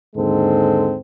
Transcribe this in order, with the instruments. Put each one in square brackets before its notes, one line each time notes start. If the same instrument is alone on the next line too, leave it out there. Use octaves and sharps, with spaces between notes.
[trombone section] D#2 G#2 D3 G#3 C4 A4